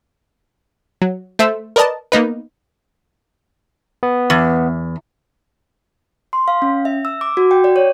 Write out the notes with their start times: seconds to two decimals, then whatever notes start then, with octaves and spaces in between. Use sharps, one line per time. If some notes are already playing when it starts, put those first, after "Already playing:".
1.02 F#3
1.39 A3 C5 E5 E6
1.76 A#4 B4 D5 D#5 A5
2.12 A#3 B3 D#4 B4
4.03 B3
4.30 E2
6.33 C6
6.48 F5
6.62 C#4
6.85 E5
7.05 E6
7.21 D6
7.37 F#4
7.51 G5
7.64 D5
7.76 C#5